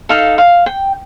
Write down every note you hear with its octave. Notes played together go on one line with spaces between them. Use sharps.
D#4 A4 D#5 F5
F5
G5